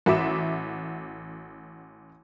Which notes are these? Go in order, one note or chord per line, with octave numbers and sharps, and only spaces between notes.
A1 F#4 E5 D6 E7